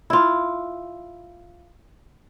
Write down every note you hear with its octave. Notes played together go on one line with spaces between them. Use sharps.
E4 F4